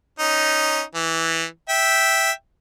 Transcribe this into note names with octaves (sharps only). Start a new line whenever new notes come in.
C#4 D#4
E3
E5 G5